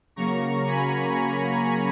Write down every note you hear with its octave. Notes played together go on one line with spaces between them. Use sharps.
C#3 F#3 A#3 A#5 C#6
G#5 B5